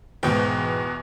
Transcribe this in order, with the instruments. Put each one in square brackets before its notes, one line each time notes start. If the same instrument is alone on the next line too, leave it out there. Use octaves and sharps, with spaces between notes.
[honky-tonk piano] E2 B2 [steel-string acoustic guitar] G#2 B4 G5